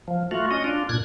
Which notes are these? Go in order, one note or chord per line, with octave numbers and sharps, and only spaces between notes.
F3
A3 F4 F#4
C#4 D#5
D4 F4
A#2 F#6 G#6